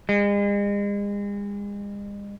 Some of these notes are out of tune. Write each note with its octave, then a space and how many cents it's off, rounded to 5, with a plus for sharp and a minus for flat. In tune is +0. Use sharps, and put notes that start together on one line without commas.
G#3 -40